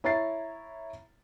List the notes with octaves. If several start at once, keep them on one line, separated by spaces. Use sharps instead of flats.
E4 C#5 A#5 A6 C7